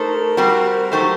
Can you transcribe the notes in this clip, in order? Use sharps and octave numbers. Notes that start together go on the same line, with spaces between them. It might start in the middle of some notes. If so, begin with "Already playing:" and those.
Already playing: A3 D#4 A4 A#4 C5
G3 C4 F#4 C5
F#3 A3 D#4 G4 A4 C5